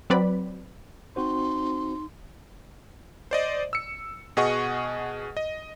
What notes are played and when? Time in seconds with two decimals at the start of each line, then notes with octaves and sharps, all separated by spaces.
0.10 F#3 C4 B4 D5 B5
1.16 C4 D#4 F#4 C5 C6
3.31 C5 D5 D#5
3.73 E6 C#7
4.37 B2 G#4 D#5 F#5 C#6
5.37 D#5